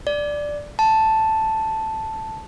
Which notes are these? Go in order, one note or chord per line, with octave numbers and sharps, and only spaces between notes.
D5
A5